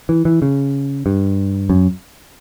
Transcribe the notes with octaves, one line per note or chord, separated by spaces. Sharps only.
E3
E3
C#3
G2
F#2